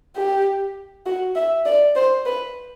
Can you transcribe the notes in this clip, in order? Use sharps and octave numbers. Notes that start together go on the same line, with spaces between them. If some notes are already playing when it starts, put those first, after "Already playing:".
G4
F#4
E5
D5
C5
B4